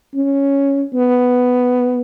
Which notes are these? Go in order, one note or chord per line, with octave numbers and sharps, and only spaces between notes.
C#4
B3